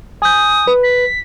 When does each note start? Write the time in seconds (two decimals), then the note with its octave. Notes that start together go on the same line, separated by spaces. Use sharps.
0.22 G#5 D#6 G6
0.67 B4
0.83 B6